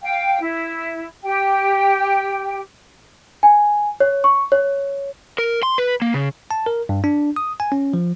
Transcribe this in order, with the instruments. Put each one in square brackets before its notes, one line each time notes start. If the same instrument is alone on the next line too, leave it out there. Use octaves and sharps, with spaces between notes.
[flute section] F5 G5
E4
G4 G5
[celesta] G#5
C#5
C#6
C#5
[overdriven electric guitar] A#4
C6
B4
A#3
C#3
[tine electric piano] A5
A#4
G2
D4
D#6
G#5
C#4
F3